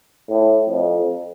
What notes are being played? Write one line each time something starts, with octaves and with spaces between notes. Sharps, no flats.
A2
F2